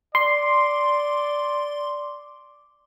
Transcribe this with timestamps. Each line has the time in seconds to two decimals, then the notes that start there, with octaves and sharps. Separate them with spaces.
0.15 D5 C6